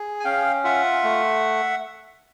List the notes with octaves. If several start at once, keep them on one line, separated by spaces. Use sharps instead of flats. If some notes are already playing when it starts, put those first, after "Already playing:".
Already playing: G#4
G#5
C#4 F5 G5
F4 E5 F#5
A3